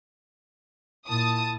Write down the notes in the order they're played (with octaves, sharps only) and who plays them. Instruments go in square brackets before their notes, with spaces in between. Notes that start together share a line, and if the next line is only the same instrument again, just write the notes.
[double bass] A#2 E4 [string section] A5 D#6